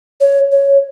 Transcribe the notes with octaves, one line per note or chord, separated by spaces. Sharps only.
C#5
C#5